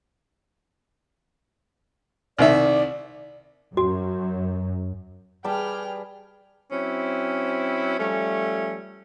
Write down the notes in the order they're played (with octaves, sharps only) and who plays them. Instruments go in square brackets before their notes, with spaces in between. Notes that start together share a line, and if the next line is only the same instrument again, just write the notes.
[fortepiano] C2 D#3 E5 [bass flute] D5
[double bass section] F#2 [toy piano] F#4
[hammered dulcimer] G3 [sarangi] G#4 [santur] B4 A5 B5 [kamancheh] G5 F6
[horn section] F#3 C4 C#4 E4
F3 G3 A3 C#4